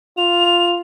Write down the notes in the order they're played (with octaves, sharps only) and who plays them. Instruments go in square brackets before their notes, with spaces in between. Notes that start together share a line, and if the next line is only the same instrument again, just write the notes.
[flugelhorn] F4 [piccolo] F7